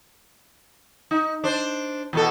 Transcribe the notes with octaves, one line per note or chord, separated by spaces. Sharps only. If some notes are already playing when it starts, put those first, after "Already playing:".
D#4
D4 C5
E2 B2 A4